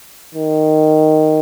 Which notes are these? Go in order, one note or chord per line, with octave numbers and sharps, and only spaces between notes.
D#3